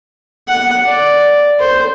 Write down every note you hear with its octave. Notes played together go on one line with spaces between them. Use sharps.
F#5
D5
C5